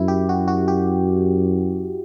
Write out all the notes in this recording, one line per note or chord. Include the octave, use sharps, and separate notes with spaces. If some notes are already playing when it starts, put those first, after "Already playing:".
Already playing: F#2 E4
G4
F#4
F#4
G4